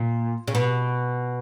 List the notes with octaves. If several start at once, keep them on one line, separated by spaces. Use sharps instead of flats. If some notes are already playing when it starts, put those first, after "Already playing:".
Already playing: A#2
C#3
B2